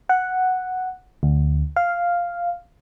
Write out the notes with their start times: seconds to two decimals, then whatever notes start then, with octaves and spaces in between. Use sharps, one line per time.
0.09 F#5
1.23 D2
1.76 F5